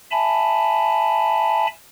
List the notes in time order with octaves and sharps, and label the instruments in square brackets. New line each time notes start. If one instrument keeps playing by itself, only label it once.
[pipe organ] E5 G#5 A5 B5